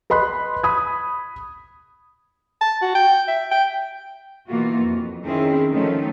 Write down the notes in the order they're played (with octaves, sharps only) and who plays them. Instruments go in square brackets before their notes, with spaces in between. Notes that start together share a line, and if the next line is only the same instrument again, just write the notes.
[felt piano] B4 D#5 B5 C6 F#6
B5 D#6 G#6
[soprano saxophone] A5
F#4
G5
E5
G5
[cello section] B2 E3 A#3 F4 F#4
F2
D#3 C4 C#4 E4 G#4 A#4
D#3 F3 F#3 A3 C#4 D#4